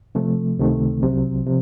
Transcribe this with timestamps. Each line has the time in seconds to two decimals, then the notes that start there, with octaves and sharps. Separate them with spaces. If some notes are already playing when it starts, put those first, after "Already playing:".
0.15 C3 F3 A3
0.58 C#2 C3 D#3 A3
1.01 C2 C3 F#3
1.46 C3 F3